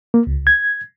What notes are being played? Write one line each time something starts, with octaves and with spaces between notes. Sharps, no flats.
A#3
C#2
G#6